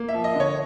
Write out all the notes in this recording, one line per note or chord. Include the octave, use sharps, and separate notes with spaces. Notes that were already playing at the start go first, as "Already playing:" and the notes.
Already playing: A#3
E5
F3
D#5
D3
C#5